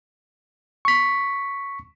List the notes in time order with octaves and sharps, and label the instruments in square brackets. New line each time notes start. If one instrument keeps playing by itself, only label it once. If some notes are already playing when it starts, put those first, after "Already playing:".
[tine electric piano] C#6 B6